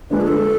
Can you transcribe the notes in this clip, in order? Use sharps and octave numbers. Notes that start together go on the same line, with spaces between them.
D3 F3 G#3 D4 B4
G#4
A4